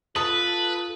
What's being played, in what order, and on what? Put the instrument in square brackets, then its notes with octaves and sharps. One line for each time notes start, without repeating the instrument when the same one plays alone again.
[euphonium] F4 [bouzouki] A4 [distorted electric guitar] B4 [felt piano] D#6